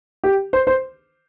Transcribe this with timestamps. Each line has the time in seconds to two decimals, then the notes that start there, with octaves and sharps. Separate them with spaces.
0.24 G4
0.53 C5
0.67 C5